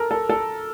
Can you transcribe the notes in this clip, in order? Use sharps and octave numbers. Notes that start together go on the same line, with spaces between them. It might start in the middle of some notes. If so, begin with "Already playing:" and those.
Already playing: A4 A#4
A4
A4